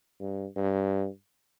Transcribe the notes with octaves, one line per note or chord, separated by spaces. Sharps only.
G2
G2